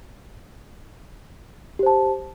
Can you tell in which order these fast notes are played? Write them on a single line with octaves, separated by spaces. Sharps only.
G4 C5 A5